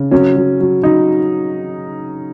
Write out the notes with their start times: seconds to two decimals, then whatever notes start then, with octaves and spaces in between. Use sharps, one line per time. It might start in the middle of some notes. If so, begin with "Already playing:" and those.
Already playing: C#3
0.11 F#3 C#4
0.36 F#3
0.60 F#3
0.83 F#3 D#4